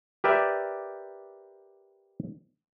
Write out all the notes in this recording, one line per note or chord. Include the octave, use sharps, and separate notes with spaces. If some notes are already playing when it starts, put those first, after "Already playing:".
G4 A#4 B4 D5 E5 G5